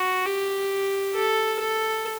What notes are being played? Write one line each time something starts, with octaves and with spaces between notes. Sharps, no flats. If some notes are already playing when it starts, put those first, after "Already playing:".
Already playing: F#4
G4
A4
A4